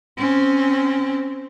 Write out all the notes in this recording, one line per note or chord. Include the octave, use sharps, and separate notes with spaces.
C4 C#4